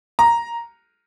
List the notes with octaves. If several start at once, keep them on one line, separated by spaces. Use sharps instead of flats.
A#5